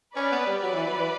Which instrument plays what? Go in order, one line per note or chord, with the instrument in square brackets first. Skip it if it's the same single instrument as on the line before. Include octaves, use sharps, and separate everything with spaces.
[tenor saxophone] C#4 [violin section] B4 D5
[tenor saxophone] B3
G3
[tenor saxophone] F#3 [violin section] B4 D5
[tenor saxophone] E3
F#3
E3